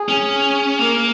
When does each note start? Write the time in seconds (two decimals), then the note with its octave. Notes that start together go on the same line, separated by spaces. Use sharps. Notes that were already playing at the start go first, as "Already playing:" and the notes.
Already playing: G#4
0.09 C#4
0.79 A#3 A#4